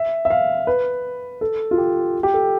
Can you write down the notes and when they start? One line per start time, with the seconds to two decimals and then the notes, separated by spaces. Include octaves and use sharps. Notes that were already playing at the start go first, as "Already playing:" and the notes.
Already playing: E5
0.25 E5
0.30 F5
0.67 B4
1.41 A4
1.71 F4
1.78 G4
2.23 G4
2.34 A4